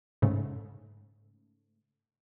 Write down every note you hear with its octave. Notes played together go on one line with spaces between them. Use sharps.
G#2 C#3 A3